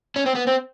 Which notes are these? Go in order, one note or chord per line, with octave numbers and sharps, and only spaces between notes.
C#4
C4
B3
C4